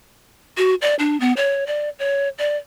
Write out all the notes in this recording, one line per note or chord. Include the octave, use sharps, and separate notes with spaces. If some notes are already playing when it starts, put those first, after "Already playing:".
F#4
D5
D4
B3
C#5
D5
C#5
D5